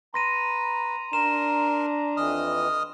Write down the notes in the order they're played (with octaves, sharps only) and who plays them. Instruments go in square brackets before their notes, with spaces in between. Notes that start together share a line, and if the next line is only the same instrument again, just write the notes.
[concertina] B4 [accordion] A#5 [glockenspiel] C6 A#6 D#7
[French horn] D4 [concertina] A#4 C6 [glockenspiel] E7
[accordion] F2 E3 [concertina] D#5 D#6 F6